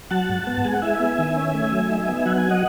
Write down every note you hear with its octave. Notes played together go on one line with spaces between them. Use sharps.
F#3 F#5 A5
G#2
B3
G#3 G#5
F#5
E4 E5 G#5
B3
D#3
C#4
A3
F#3
D#4
B3
F#3 F#5
G#5
D#5 F#5